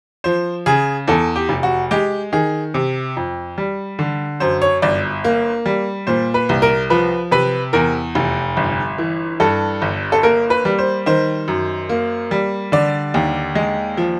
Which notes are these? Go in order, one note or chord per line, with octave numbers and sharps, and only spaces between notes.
F3 C5
C#3 G#4
E2 A4
G4
F1
F#4
G#3 G4
D#3 G#4
C3
F2
G3
D3
F#2 C5
C#5
G1 D5
A#3
G3
A#2 C5
B4
C2
A#4
F3 B4
C3 B4
E2 A#4
F1
G1
E3
G2 A4
G1
A4
A#3 A#4
B4
G3
C5
D#3 C5
F#2
A#3
G3
D3 D5
D#2
G#3
F3